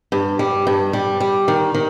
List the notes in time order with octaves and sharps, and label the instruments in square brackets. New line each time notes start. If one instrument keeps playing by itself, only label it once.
[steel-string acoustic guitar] G2
G3
G2
G3
G3
D#3
D#3